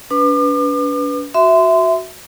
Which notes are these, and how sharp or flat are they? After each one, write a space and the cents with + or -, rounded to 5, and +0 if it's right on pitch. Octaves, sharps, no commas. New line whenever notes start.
D4 -45 B4 +0 D6 +40
F#4 +0 E5 +0 C6 -25